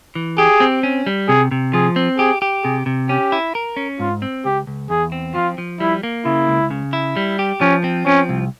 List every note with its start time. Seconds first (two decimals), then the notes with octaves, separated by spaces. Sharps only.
0.15 E3
0.38 G4 G#4
0.60 C4
0.83 C#4
1.07 G3
1.28 C3 G#4
1.51 C3
1.73 F3 G#4
1.96 C4
2.19 G4 G#4
2.42 G4
2.63 C3 G#4
2.86 C3
3.09 C#4 G4
3.32 E4
3.55 A#4
3.77 C#4
3.99 G#2 F4
4.22 C4
4.45 C#2 G4
4.67 C#2
4.90 E2 G#4
5.12 C4
5.35 F3 F4
5.58 F3
5.80 G3 E4
6.03 A#3
6.26 C#3 E4
6.48 C#2
6.71 C#3
6.93 E4
7.17 G3
7.39 G4
7.61 F3 C#4
7.84 C4
8.07 F3 C#4
8.29 C2